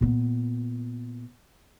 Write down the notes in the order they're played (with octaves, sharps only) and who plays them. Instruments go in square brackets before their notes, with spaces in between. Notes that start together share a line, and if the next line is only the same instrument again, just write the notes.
[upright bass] A#2 B3